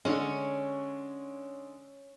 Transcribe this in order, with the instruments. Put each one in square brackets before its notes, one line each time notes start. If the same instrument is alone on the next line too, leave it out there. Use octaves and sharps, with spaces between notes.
[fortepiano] D3 G#3 [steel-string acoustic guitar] C#4 C#5